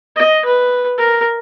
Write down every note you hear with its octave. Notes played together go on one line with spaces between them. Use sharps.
D#5
B4
A#4